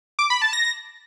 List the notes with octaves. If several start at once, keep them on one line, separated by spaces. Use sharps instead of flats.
D6
B5
A5
A#6